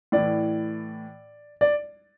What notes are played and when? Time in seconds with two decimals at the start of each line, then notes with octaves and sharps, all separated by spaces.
0.12 A2 E3 D5
1.61 D5